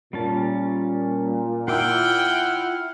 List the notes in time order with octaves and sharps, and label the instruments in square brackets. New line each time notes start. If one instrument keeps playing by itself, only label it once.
[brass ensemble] A#2 [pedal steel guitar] G3 C#4 A5
[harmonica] E4 F#5 F6 [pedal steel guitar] F4 D6 E6 [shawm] G5